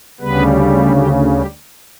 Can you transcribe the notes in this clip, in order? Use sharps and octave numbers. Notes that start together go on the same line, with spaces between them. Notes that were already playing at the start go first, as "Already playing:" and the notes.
D2 C#3 G3 B3 B4
G3 G4
G3 G4